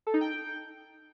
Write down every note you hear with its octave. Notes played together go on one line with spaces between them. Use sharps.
A4
D#4
G5